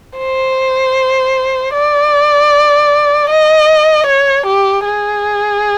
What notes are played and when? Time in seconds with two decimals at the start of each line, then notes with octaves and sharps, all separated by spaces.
0.18 C5
1.73 D5
3.29 D#5
4.06 C#5
4.46 G4
4.85 G#4